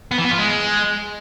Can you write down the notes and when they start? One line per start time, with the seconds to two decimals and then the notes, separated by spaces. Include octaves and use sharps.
0.11 B3
0.18 E3
0.25 B3
0.31 F4
0.38 G#3